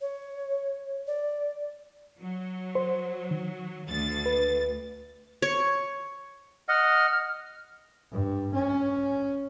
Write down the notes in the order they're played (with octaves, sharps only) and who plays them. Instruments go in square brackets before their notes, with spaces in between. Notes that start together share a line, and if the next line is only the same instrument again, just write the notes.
[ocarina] C#5
D5
[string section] F#3
[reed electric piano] C5
D#3
[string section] D2 A6
[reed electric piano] B4
[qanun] C#5
[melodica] D#5 F#5 [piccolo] F6
[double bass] G2
C#4